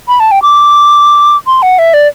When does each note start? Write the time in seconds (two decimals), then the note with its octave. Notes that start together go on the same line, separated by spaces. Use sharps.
0.08 B5
0.20 A5
0.31 G5
0.42 D6
1.47 C6
1.62 F#5
1.79 E5
1.94 D5